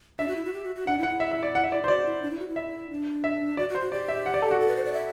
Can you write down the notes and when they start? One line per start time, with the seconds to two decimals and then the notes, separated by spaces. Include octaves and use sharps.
0.19 D4 E5
0.28 F#4
0.36 E4
0.45 F#4
0.53 G4
0.64 F#4
0.75 F#4
0.87 D4 F#5
0.99 E4
1.03 F#5
1.09 E4
1.20 E5
1.31 E5
1.43 D5
1.55 F#5
1.64 E5
1.72 D5
1.83 E4 C5
1.88 F#4 D5
2.06 E4
2.22 D4
2.31 E4
2.39 F#4
2.48 E4
2.56 E5
2.90 D4
3.24 E5
3.57 F#4 D5
3.69 F#4
3.75 C5
3.80 F#4
3.92 G4 D5
4.08 E5
4.26 F#5
4.34 D5
4.42 A4
4.51 F#4
4.59 A4
4.68 B4
4.76 C5
4.85 D5
4.93 E5